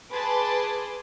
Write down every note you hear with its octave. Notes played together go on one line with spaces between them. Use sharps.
G#4 B4 A5 C6 D6